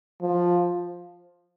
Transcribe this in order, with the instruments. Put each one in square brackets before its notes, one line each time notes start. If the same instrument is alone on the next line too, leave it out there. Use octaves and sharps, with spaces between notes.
[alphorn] F3